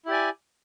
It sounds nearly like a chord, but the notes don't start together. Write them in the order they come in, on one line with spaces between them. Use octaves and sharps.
E4 G4 D5 G#5